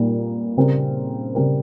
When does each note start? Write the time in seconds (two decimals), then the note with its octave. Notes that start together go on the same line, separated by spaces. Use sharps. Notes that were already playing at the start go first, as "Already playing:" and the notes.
Already playing: A#2 G3 A#3 D#4
0.57 C#3 G3 C4 G4 A#4
1.35 C#3 G3 C4 G4 A#4